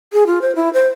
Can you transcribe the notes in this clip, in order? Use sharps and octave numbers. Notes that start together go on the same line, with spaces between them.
G#4
F4
C5
E4
C5